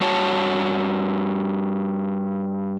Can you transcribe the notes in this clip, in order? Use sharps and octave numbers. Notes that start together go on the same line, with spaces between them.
G2 F#4 C#5 A5